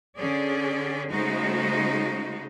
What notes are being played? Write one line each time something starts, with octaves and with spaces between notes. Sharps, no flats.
D3 C#4 G#4 D5
C#3 G#3 A3 D#4 F#4 C5